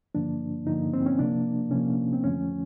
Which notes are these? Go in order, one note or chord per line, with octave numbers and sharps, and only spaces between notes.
G2 D3 F3 A#3 D4
G2 D3 F3 A#3 D#4
C4
C#4
C3 F3 A#3 D4
C3 F3 A#3 C#4
C4
F2 D3 F3 A3 C#4